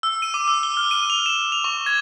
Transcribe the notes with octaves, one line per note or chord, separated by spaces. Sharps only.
E6
D#7
D6
E6
G7
F6
D#7
F7
E7
F7
C#6
G#6